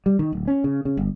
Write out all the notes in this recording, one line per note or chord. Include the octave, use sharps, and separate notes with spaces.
G3
D#3
D1
C#4
C#3
C#3
G1